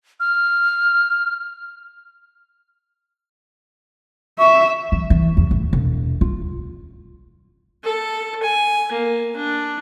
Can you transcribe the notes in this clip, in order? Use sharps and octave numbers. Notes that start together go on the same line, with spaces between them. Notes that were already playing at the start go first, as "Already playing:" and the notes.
F6
E5 C#6
E3
E3
E2
A1
E1
F4
A4
G#5
A#3
D4